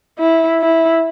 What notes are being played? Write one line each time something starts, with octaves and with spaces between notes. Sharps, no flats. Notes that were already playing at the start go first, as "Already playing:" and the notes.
E4
E4